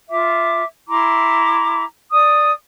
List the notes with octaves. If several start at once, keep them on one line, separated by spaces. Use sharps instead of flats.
F4 E5 D6
E4 A#5 C6 D6
D5 D#6